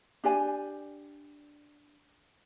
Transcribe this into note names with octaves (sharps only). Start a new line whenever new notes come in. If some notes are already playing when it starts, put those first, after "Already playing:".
D4 G4 D5 G#5